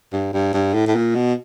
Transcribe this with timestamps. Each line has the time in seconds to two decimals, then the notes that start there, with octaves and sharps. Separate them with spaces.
0.13 G2
0.34 G2
0.53 G2
0.74 A2
0.87 A2
0.96 A#2
1.15 B2